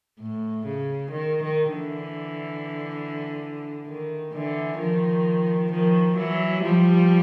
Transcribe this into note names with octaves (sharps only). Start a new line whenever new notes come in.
A2
C#3
D#3
D#3
D3 E3
D#3
D3 E3
D#3 F3
D#3 F3
E3 F#3
F3 G3